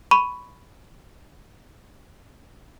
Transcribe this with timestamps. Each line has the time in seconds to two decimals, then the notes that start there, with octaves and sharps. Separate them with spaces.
0.11 B5 C#6 D#7